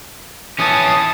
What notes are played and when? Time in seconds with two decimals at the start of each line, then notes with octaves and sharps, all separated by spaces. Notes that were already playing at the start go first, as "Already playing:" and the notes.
0.59 E3 C#4 A5 D#6